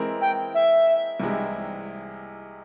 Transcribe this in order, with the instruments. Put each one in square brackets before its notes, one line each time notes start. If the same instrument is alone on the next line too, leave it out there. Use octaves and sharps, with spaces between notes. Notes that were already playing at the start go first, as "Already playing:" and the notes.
Already playing: [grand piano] E3 G#3 C4 E4 A#4
[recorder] G5
E5
[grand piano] C2 C3 E3 G#3 E4